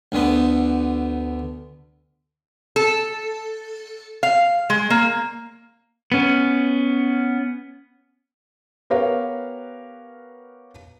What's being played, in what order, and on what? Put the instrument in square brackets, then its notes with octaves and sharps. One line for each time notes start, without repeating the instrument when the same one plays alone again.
[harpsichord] D2 D3 B3
[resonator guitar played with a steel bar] A4
F5
G#3
A#3
[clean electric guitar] B3 C#4
[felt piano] B3 G4 A#4 B4 C#5 F5